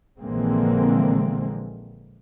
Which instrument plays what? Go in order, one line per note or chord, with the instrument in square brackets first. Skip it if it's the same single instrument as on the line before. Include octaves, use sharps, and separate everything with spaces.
[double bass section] A#1 D3 E3 G#3 A#3 C4